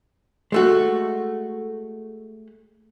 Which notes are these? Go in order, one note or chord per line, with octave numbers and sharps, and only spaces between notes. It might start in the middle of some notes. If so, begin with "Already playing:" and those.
G#3 A3 F#4